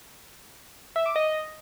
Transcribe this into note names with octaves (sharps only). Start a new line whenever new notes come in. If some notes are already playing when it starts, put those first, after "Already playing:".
E5
D6
D#5